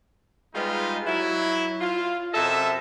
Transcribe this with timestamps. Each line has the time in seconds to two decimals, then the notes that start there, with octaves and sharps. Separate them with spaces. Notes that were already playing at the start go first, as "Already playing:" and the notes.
0.54 G3 G#3 B3 D#4 F4
1.06 F#3 E4
1.80 F4
2.34 F#2 C3 A4 D#5 E5